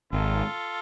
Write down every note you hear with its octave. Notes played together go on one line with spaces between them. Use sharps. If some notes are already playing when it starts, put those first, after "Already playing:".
G#1 F4 A4